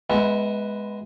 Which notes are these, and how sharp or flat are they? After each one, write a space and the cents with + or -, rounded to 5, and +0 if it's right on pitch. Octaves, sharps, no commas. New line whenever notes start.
G#3 +0 B3 +0 E4 -25